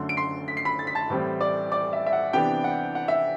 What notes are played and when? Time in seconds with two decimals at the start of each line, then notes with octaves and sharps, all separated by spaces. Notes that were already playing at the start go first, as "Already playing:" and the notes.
Already playing: F#2 D3 A3 C6
0.09 D7
0.17 C6 C7
0.48 B6
0.57 C7
0.65 B5 B6
0.79 A6
0.87 B6
0.95 A5 A6
1.10 A2 E3 G3 C4
1.41 D5 D6
1.72 D5 D6
1.93 E5
2.06 E5
2.13 F#5
2.33 C3 E3 B3 D4 G4 G5
2.64 F#5
2.95 F#5
3.08 E5